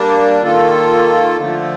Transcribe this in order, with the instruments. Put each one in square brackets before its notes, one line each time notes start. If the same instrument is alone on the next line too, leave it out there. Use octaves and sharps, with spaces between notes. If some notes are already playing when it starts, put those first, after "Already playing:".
Already playing: [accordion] G3 A#3 D4
D#3 A#3 F4 A4
D3 F3 A3